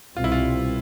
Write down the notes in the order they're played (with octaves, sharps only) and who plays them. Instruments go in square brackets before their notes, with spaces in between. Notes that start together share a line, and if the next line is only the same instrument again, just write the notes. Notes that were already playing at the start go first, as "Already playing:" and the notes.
[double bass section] C2 B2 G3 C4 [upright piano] F4
[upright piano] E4
F4